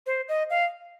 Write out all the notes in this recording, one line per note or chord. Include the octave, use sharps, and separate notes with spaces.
C5
D#5
F5